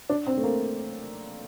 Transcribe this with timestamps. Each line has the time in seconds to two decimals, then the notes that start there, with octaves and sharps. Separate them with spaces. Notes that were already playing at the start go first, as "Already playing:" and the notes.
0.09 D4
0.27 C4
0.38 A3
0.43 A#3